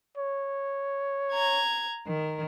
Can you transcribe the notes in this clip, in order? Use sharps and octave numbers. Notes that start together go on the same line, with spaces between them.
C#5
A#5 G#6
D#3 A#4